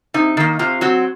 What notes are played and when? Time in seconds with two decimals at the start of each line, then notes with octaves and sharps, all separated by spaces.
0.14 C3 D#4
0.37 D#3 A#3
0.59 C3 F4
0.81 F#3 C4 F#4